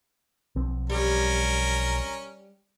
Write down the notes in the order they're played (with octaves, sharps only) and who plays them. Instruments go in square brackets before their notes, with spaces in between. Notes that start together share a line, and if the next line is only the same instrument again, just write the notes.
[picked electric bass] B1 F3 C4
[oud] G3 G4 [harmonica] C#4 A#4